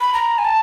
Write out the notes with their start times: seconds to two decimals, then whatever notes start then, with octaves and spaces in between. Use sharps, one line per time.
0.01 B5
0.14 A#5
0.38 G#5
0.45 A5